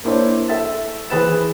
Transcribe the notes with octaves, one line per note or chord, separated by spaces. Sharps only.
A#3 D4 E4 C5 C#5
A4 E5 A6
E3 G#4 B4 C5 A6 E7